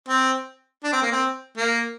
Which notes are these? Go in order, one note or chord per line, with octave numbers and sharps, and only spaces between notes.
C4
D4
C4
A#3
C4
A#3